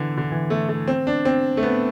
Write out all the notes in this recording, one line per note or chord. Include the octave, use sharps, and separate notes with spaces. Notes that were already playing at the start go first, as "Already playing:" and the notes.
Already playing: D3 E3
D3
E3
A3
A3
C4
D4
C4
A3
B3